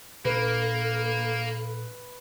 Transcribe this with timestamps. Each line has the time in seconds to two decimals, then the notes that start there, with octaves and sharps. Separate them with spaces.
0.25 A#2 A#3 D4 A4 B4